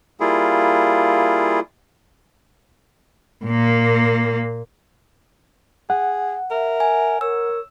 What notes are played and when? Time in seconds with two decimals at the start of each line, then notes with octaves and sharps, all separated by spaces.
0.20 G3 A#3 E4 F4 G#4
3.46 A#2 A#3
5.90 G#4 F#5
6.51 A#4 E5
6.80 G#5
7.21 A#4 C#5 E6